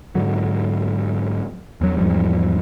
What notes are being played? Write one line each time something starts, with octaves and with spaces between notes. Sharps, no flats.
G#2 D3 F#3
E2 F#3
E2 G#2 F3 G3